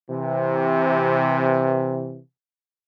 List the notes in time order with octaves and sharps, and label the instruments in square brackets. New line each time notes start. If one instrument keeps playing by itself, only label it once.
[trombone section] C3 E3